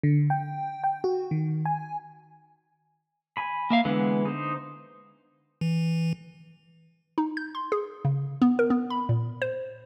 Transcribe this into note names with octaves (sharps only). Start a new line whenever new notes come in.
D3
G5
G5
F#4
D#3
G#5
G#5 B5
A#3 E5 F5
D3 E3 G#3 B3
D#4 C5
E3
D#4
G6
C6
G#4
C#3
B3
A#4
B3
B5
A#2
C5